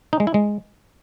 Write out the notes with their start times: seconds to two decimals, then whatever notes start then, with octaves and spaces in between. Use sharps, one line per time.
0.13 D#4
0.20 G#3
0.27 E4
0.34 G#3